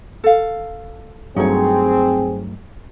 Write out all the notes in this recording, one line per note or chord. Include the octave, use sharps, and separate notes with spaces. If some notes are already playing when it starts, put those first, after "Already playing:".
A4 F5
G2 F#3 A3 C4 D#4 G#4 C#5